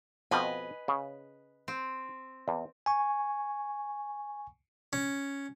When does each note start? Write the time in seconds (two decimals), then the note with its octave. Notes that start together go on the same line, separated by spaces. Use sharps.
0.31 F2 B2 F3 B4 D#5 G#5
0.88 C#3
1.68 C4
2.48 E2
2.86 G#5 C#6
4.93 C#4